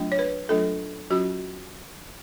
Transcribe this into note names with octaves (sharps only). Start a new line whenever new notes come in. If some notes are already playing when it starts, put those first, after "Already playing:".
Already playing: F#3 A3 D4 F4
C#5
B4
F#3 A3 D4 F4 A4
F#3 C#4 F4 F#4